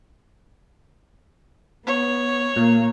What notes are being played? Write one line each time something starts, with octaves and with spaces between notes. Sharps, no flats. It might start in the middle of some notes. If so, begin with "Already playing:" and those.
B3 C#5
A#2 A#3